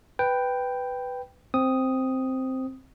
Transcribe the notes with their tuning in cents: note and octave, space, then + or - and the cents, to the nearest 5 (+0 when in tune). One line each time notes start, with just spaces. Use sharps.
B4 +5 G5 +0
C4 +0 D#6 +0